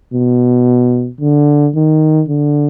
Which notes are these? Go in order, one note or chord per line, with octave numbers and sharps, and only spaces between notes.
B2
D3
D#3
D3